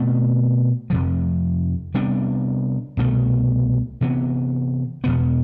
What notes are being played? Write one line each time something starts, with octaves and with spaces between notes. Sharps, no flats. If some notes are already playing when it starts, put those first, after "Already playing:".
Already playing: B2 A3 C4
F2 C3 F3
C3 G3 B3 D4
C2 B2 A3
C3 E3 B3
E2 B2 B3